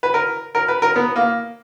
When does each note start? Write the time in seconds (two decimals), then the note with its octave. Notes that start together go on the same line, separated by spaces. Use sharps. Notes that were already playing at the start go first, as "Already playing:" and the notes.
0.03 B4
0.14 A#4
0.55 A#4
0.68 B4
0.82 A#4
0.96 B3
1.16 A#3